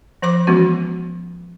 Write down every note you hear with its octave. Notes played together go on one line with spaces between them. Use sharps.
F3 C5 B5 D6
E3 F3 G#3 B3 C#4 F#4